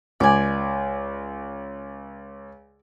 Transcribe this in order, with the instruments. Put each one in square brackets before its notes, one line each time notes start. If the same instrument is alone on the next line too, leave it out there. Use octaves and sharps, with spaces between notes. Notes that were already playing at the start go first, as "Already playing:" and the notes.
[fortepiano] C#2 [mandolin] D5 G#5